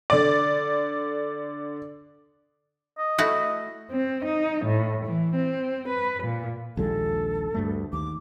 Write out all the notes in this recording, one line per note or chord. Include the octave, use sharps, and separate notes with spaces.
D3 D5
D#5
A3 E4 F#4
C4
D#4
A2
E3
C4
B4
A#2
A#1 D#2 G#3 A4
D2 G2 A3
D#2 D6